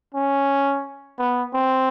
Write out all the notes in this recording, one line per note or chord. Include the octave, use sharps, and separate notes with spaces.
C#4
B3
C4